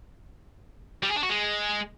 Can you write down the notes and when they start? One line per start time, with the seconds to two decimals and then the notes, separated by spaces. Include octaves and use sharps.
1.03 G3
1.10 G#4
1.16 D4
1.23 F#4
1.30 G#3